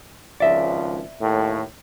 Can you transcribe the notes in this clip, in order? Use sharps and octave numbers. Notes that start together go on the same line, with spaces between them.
G#1 C#2 F3 D5 E5
D#2 A2